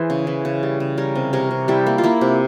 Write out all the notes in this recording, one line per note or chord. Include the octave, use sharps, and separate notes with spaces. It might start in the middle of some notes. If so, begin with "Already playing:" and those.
Already playing: E3 G#4 C5
C#3
E3
C#3
G3
C#3
G3 A#4 C#5
C3
C3 A#4 C#5
C3
G3 E4 G4
A#3
F4
A#3 E4
C3